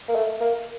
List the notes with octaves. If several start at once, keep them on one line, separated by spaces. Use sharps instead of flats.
A#3
A3
A#3